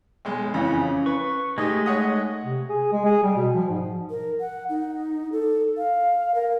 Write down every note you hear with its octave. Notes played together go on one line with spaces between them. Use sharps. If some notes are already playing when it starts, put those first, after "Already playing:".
B1 G#3
F2 C#3 E3 C#4
B4 C#6
G#3 A3 D#4 G4 D#5
C#5 F#5 D#6
C3
G#4
G#3
G#4
G3
B2
F3
G#2
A#4
F#5
D#4
A4
F5
A#4